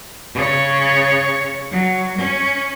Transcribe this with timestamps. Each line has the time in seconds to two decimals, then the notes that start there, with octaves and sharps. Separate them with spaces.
0.35 C#3 C#5
1.71 F#3
2.18 C#4